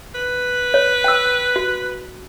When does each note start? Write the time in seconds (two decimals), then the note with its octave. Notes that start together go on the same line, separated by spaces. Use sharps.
0.15 B4
0.74 C#5
1.04 G5 E6
1.56 F#4